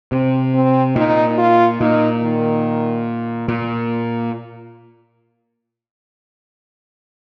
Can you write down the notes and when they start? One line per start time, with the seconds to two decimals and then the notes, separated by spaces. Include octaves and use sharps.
0.12 C3 C4
0.54 C4
0.96 A#2 D#4
1.38 F4
1.80 A#2 D#4
2.22 D#3
3.48 A#2